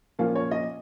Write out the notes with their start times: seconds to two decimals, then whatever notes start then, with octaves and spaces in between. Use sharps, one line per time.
0.19 A#2 F3 A#3 C#4 F5
0.35 C#5
0.51 D#5